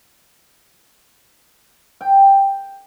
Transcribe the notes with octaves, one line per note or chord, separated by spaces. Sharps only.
G5